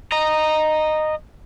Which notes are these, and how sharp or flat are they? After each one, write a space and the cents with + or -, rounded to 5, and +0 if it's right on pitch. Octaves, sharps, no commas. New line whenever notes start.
D#5 -10 A#5 +0